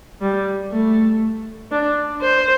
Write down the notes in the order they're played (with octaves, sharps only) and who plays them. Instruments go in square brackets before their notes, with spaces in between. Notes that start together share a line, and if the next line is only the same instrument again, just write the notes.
[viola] G3
A3
D4
C5